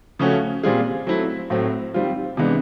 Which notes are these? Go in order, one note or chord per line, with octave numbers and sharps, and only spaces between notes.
C#3 F3 A3 C#4 F#4
A#2 G3 C4 F4 G#4
F#3 A3 C4 E4
A2 F#3 A3 C4
D#3 G3 C4 F4
C3 E3 G#3 B3 D4